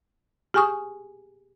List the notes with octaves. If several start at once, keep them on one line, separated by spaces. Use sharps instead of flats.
G4 G#4 G#5 C#6 D#6